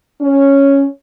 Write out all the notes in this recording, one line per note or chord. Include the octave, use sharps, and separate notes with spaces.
C#4